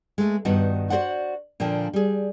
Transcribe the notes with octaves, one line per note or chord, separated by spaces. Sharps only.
G#3 A3
G2 D#3 B3 D#4 F#4
F#4 G4 C5 D5 F#5
A#2 D3 F3 A#4 G5
G3 G#4